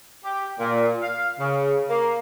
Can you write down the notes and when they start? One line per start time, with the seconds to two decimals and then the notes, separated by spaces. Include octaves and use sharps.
0.24 G4
0.59 A#2
1.01 F5
1.39 C#3
1.89 A#3